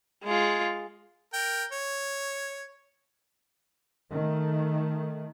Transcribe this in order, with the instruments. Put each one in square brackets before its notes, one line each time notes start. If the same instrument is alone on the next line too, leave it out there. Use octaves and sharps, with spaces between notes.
[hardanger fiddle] G#3 F4
[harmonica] A#4 G5
C#5
[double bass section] D#3 A3